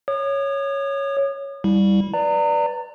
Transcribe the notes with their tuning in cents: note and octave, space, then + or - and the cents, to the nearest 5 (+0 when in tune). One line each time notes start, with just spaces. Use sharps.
C#5 +0 D#6 -40
G3 +0 E4 -20
B4 +0 D5 +0 A#5 -30